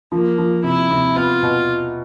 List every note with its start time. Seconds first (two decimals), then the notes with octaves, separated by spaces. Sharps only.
0.12 F3 A#3
0.38 F3
0.64 C3 E4
0.91 C3
1.16 B3 F4
1.43 B2